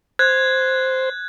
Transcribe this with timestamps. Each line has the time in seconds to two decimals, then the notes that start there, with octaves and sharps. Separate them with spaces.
0.19 C5 F#6 G#6